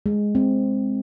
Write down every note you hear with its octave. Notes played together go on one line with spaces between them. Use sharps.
G#3
C4